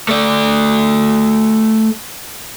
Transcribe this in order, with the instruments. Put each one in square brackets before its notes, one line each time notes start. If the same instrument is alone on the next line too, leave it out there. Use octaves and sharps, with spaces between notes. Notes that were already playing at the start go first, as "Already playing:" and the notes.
[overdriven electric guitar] A3 D5